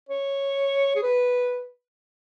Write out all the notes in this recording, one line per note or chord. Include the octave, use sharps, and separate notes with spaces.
C#5
G#4
B4